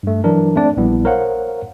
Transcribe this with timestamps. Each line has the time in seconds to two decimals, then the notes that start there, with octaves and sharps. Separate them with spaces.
0.03 G2 A3
0.24 E3 F#3 D4 A#4
0.56 A3 C4 D4 D5
0.77 A#1 G3 B3 E4
1.05 A#4 C5 C#5 F5 F#5